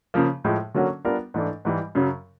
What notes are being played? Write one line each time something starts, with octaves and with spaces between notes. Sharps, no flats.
C#3 F3 A#3
A2 F3 G#3
D3 F#3 A#3 C#4 F#4
G3 B3 D4 F4 A#4
G#2 E3 A3 D4
G#2 E3 G3
F#2 C#3 F#3